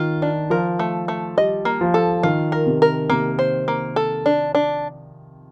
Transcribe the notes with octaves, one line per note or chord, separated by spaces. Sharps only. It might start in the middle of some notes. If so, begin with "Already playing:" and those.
Already playing: D#3 F4
D4
F3 A#4
A3
A3
G3 D#5
A#3
F3
A4
D#3 F4
A#4
C3
A#4
C3 A#3
C5
A#3
A4
D4
D4